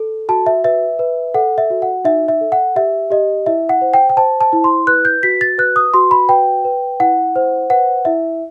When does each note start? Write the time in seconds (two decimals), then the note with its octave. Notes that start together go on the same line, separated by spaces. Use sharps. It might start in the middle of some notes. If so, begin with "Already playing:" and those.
Already playing: A4
0.29 F#4 A5
0.46 E5
0.64 B4 E5
0.99 B4
1.34 A4 F#5
1.58 E5
1.70 F#4
1.82 F#5
2.05 D#4 E5
2.28 E5
2.41 A4
2.52 F#5
2.76 G4 E5
3.11 G4 D#5
3.46 E4 E5
3.69 F#5
3.81 C5
3.94 G5
4.09 G5
4.17 C5 A5
4.41 A5
4.53 E4
4.64 C6
4.87 B4 F#6
5.05 G6
5.23 F#4 B6
5.41 A6
5.58 B4 F#6
5.76 D#6
5.94 F#4 C6
6.11 B5
6.29 B4 G5
6.65 B4
7.00 E4 F#5
7.36 C5
7.70 B4 F#5
8.05 E4 E5